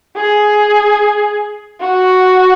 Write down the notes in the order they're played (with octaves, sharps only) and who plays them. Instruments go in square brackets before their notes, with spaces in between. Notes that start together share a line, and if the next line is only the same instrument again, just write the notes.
[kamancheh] G#4
F#4